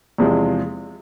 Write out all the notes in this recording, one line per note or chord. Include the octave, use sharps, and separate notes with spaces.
E2 C3 F3 G#3